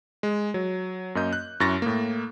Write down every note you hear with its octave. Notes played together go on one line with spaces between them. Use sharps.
G#3
F#3
F#2 A#3 D#5 G6
F#6
F#2 E4 C#6 A6 A#6
A2 A#3